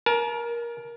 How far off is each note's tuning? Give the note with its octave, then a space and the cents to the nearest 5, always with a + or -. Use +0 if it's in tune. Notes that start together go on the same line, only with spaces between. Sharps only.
A#4 +20 A5 -40